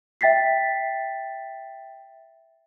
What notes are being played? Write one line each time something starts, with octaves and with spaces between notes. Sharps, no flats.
E5 G5 A6 B6 C7